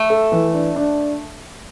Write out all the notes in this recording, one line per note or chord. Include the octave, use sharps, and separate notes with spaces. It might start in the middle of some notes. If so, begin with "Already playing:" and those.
Already playing: A3
A4
E3
D4
D4